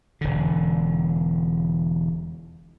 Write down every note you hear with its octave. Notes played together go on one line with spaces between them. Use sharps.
E1 D3